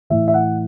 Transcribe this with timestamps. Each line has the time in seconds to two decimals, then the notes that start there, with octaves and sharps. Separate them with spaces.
0.10 A2 E3 E5
0.28 E5
0.34 F#5